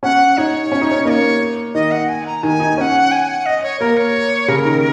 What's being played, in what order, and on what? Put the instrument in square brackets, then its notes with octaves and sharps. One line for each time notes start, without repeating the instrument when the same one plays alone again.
[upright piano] C#4 [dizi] F#5
[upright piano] D#4 [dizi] C#5
[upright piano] C#4
D#4
C#4
[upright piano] A#3 [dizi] D#5
[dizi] C#5
[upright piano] D#3 [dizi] D#5
[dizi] F#5
G#5
A#5
[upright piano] D#3 [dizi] G#5
[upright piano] D#4
[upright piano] C#4 [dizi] F#5 G#5
[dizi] G#5
F#5
D#5
C#5
[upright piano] A#3 [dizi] A#4
[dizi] C#5
[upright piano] C#3 [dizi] A#4
[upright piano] D#3